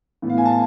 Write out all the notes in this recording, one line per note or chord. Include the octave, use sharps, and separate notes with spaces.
A2 E3 B3
F5
G#5
A5